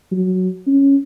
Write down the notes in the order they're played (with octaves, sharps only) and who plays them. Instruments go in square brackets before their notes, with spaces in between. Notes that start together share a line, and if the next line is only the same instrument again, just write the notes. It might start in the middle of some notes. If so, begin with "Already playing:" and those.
[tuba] F#3
C#4